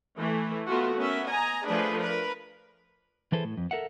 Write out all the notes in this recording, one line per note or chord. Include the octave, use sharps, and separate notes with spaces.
E3 A3
A3 B3 F4 F#4
B3 C#4 A#4 E5
D#5 G#5 A#5
F3 A3 D4 G#4 B4
A#4 B4
E3 E4 G#4 A4 B4 C5
A2
F2
A4 A#4 E5 F#5